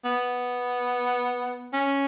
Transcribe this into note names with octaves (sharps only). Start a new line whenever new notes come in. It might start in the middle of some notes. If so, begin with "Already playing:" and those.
B3
C#4